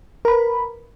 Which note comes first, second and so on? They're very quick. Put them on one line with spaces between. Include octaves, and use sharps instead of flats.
A#4 B5 B4